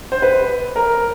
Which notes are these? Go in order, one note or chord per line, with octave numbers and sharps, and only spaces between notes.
C5
B4
A#4